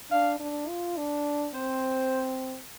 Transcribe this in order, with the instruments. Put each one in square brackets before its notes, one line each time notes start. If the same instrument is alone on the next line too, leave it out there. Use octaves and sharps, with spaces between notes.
[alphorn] D4 [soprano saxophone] F5
[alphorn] D4
F4
D4
[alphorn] C4 [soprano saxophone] C5